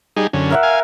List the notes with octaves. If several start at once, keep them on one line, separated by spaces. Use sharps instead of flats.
G3 D#4 G#4
F#2 D3 C#4
A#4 E5 F#5
F5 G#5